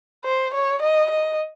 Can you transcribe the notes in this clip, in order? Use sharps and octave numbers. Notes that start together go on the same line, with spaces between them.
C5
C#5
D#5
D#5